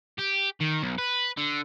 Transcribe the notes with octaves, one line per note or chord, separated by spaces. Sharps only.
G4
D#3
B1
B4
D3